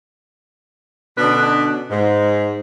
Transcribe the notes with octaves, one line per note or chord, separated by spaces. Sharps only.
B2 D3 C#4 D4 B4 D#5
G#2